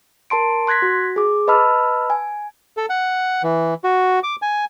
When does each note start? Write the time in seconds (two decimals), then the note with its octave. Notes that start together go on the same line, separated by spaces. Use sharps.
0.30 A#4 A5 C6 D7
0.67 C6 F#6 G#6 A#6 B6
0.82 F#4
1.16 G#4 D6
1.48 B4 D#5 A5 B5 E6 F6
2.10 G#5
2.77 A4
2.90 F#5
3.43 E3
3.84 F#4
4.23 D6
4.42 G#5